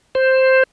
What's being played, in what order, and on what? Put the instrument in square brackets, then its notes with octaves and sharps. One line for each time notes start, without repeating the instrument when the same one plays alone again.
[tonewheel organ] C5